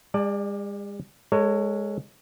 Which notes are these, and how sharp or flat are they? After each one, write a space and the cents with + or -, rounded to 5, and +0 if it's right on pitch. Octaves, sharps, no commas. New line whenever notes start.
G#3 -45 D5 +15 A5 +0
G#3 -5 A4 +30 C#5 +0